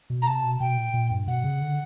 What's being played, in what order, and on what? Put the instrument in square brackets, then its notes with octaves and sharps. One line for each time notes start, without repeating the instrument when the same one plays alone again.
[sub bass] B2
[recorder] A#5
[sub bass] C3 [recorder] A5
[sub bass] B2
[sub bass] B2 [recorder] G5
[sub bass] A#2
A#2
G2
[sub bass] B2 [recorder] F#5
[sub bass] C#3
D3